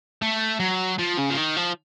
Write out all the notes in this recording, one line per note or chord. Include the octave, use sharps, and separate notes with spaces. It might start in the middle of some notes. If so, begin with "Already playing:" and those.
A3
F#3
F3
C#3
F3
D#3
F3